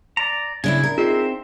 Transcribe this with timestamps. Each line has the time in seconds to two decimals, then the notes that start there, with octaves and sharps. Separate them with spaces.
0.17 D5 A#5
0.64 C#3 D4 E4 G#5
0.84 A#4
0.98 C4 D#4 F4 G#4 C5 E5